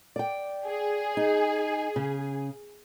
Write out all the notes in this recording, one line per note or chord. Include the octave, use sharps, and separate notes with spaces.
D5 G5
G#4
D#4
C#3